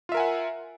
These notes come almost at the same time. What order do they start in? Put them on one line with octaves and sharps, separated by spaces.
F4 E5 A#4 G#5 F#5